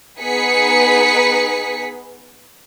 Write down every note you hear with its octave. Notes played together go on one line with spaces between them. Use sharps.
B3 D#4 G#4 B4 B6 C#7